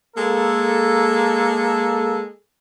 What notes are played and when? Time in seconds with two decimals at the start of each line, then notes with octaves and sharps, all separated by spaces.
0.16 G#3 A#3 A4